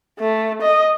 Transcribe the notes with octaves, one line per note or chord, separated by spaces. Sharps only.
A3
D#5